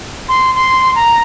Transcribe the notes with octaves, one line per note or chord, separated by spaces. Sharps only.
C6
C6
A#5